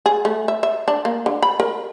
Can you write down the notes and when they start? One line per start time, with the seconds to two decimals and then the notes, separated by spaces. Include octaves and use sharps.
0.06 G#4
0.25 A3
0.48 E5
0.63 E5
0.88 D4
1.05 A#3
1.26 D3
1.42 B5
1.60 A#4